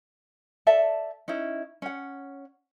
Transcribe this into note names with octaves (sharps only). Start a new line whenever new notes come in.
A4 D5 E5 A5
C#4 D#4 E4
C#4 F#5